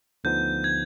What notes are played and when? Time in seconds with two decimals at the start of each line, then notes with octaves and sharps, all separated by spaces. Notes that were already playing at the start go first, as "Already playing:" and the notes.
0.24 D2 D3 F3 B3 D#4 G6
0.64 G#6